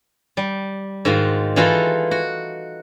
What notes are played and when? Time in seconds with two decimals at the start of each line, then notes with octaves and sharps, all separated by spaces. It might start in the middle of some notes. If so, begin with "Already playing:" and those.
0.37 G3
1.05 G#2 D#3 F4 F#4
1.56 E3 G#3 D#4 F4 F#4 A4
2.11 F#4